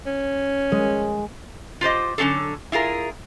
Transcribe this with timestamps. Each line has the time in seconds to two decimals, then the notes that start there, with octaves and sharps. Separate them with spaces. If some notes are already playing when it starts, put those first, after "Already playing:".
0.06 C#4
0.72 G#3
1.81 F4 G4 C5 D#5
2.18 D3 F#3 C#4 G#4 A4
2.72 E4 F4 G#4 A#4